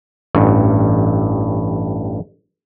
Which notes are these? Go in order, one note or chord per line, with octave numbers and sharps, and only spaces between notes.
A1 G2